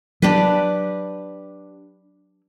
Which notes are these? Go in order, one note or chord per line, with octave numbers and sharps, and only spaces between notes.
F#3 D4 G4 B4